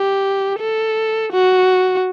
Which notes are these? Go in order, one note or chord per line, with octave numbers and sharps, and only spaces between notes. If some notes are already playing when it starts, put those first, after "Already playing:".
Already playing: G4
A4
F#4